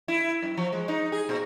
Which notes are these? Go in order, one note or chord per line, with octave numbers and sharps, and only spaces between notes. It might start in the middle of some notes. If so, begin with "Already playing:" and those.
E4
F#2
F3
G#3
D#4
G#4
A#2